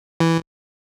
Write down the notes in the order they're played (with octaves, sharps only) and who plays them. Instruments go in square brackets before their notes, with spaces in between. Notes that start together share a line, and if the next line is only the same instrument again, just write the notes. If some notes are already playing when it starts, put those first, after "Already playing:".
[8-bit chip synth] E3